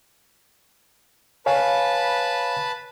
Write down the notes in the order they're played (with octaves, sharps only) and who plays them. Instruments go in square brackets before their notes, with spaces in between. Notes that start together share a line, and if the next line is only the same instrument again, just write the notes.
[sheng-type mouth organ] B4 A5 B5 [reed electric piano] C#5 F5 G#5